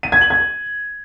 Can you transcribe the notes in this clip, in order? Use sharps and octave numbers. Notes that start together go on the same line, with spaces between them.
D#7
G#6
F#7
G#6